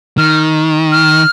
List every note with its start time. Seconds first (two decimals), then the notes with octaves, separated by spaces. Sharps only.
0.18 D#3 F6
0.92 F6